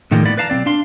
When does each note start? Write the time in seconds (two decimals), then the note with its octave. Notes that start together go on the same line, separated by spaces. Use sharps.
0.11 A2 D#3 F3 G3 G#3 A#3
0.25 A2 B3 D5 B5
0.37 B4 D5 F5 A5 A#5
0.50 B1 C#3 C4 D5
0.66 D4 F5 C6